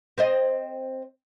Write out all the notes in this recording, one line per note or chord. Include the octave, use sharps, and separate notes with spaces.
C4 C5 D#5